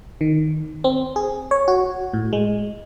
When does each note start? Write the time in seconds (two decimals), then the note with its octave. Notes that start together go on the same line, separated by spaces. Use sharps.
0.21 D#3
0.84 C4
1.16 G#4
1.51 C#5
1.68 F#4
2.13 A2
2.33 G#3